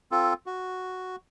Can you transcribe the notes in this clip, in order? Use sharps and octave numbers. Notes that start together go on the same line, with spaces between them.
C4 F4 A4
F#4